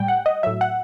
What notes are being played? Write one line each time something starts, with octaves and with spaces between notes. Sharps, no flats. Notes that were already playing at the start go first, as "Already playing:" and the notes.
Already playing: A2 G3 G5
F#5
D#5
A2 F#3 E5
F#5